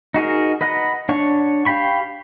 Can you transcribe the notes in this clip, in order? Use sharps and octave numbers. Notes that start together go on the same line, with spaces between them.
D#4 F#4 G#4 A#4
B4 D#5 F#5 A#5
D4 C#5 F#5 C#6
G4 F5 G5 B5 C#6